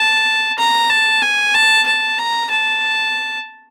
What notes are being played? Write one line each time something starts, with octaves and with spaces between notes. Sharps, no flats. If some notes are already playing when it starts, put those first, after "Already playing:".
Already playing: A5
A#5
A5
G#5
A5
A5
A#5
A5